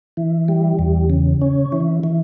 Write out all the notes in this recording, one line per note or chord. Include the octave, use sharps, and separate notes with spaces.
E3
G3
E2
C#3
C#4
E3
E3